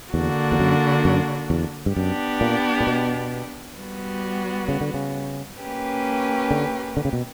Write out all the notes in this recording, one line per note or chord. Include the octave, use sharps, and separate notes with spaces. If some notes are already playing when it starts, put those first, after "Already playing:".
E2 D3 A#3 D4 F#4
E2
F#2
F#2
E2
G2
F#2 B3 D4 G4
A#2
A#2
B2
G3 B3 F#4
C#3
D3
C#3
A#3 C#4 G4 B4
D3
D3
C#3
B2